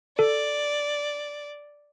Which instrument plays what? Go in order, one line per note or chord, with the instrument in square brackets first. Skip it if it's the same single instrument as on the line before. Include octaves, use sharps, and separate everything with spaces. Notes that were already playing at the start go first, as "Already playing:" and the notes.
[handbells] A4 [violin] D5